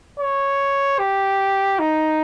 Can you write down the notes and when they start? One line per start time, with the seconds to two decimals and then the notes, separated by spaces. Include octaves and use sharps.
0.20 C#5
0.99 G4
1.79 D#4